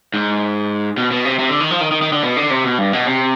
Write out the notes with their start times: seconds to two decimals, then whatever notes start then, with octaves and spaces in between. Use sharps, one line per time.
0.14 G#2
0.97 B2
1.11 B2
1.25 C3
1.39 C3
1.50 D3
1.60 D#3
1.71 F3
1.81 D#3
1.91 D#3
2.02 D#3
2.12 D3
2.23 B2
2.37 D3
2.50 C3
2.65 B2
2.78 G2
2.93 B2
3.07 C3